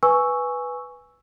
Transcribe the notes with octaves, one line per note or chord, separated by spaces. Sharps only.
B4 G#5 C#6 E6